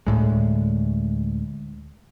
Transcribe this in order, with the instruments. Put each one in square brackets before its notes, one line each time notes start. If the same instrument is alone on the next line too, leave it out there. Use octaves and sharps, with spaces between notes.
[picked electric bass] D2 A2 G#3